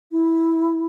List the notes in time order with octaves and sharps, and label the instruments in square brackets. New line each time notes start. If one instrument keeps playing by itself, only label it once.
[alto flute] E4